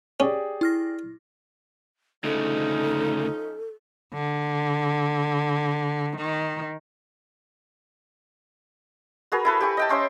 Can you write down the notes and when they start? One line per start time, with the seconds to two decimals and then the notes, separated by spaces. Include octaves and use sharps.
0.20 C#4 G4 G#4 D5
0.61 E4 F6 A#6
2.24 D2 C#3 F3 C#4 D#4 A4
4.14 D3
6.17 D#3
9.32 F#4 G#4 A#4 B4
9.45 E4 A4 B4
9.61 G4 G#5 C#6
9.77 D#5 G5 A5
9.89 C#4 C5 E5 C6